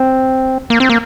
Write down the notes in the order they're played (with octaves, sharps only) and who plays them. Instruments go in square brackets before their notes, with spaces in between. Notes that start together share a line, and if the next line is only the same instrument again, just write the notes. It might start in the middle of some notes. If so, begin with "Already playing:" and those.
Already playing: [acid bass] C4
A#3
C4
A#3